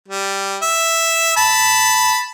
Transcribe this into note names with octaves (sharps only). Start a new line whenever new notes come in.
G3
E5
A5 B5